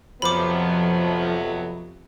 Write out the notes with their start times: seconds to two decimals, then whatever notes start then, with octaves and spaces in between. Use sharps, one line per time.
0.22 F2 C3 F3 F#3 A3 B3 B5 D6